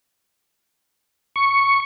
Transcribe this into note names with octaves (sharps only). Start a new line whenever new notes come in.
C#6